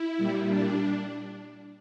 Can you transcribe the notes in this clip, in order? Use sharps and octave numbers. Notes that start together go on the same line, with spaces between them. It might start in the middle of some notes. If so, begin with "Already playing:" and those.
Already playing: E4
A#2 G3
D4